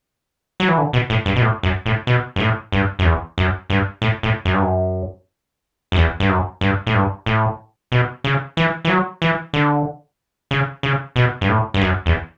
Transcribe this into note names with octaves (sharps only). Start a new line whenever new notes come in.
F#3
E3
D3
B2
A2
G2
B2
A2
F#2
A2
B2
G2
A2
G2
F#2
E2
F#2
G2
A2
A2
F#2
G2
F#2
F#2
E2
G2
F#2
G2
A2
G2
A2
B2
C#3
E3
E3
F#3
E3
D3
C#3
C#3
B2
G2
A2
G2
F#2
E2